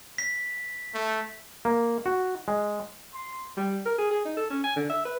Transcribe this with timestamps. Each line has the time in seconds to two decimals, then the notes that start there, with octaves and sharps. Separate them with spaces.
0.18 B6
0.94 A3
1.65 A#3
2.06 F#4
2.48 G#3
3.14 C6
3.57 G3
3.86 A#4
3.98 G#4
4.11 G#4
4.25 D#4
4.37 A4
4.50 C#4
4.64 G#5
4.76 D3
4.90 E5
5.05 B4